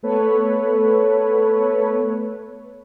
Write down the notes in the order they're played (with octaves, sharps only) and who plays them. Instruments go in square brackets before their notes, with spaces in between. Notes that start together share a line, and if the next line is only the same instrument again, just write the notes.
[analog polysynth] A3 B3 A4 B4 C#5